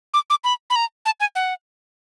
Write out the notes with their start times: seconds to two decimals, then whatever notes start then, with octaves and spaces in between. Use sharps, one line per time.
0.14 D6
0.30 D6
0.44 B5
0.70 B5
0.76 A#5
1.06 A5
1.20 G#5
1.35 F#5